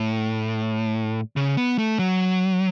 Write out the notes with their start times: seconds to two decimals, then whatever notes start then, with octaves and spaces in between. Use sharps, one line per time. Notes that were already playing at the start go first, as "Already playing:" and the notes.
Already playing: A2
1.36 C#3
1.57 B3
1.78 A3
1.99 F#3